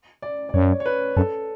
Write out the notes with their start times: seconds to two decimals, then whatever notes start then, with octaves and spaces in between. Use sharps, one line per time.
0.22 D5
0.49 D5
0.54 F#2 C#5
0.80 C#5
0.86 B4
1.17 F#2 A4